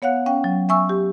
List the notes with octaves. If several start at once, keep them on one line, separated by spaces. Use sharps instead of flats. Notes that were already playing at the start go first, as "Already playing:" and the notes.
B3 C#5 F5 F#5 F#6
C#4 F5 G5
F#3
E5 G#5 C#6 E6
G4